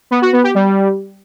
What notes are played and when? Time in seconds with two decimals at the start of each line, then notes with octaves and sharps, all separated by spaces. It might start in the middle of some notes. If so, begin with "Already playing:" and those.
0.11 B3
0.22 F#4
0.33 B3
0.44 G4
0.55 G3